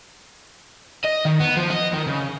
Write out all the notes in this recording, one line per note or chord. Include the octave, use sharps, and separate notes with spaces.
D#5
D#3
B3
F3
D#5
D#3
C#3